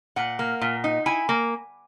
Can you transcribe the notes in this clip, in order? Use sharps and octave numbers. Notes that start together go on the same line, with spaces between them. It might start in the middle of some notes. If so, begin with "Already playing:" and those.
A#2 F#5
A#3
A#2
D#4
E4 G#5
A#3